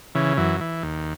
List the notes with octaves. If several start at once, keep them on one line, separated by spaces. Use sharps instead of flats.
C#3 E3
F#2 E3
E3
D#2